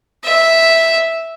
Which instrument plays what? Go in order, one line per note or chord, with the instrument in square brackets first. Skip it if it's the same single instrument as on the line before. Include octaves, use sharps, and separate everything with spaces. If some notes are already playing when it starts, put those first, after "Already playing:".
[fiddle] E5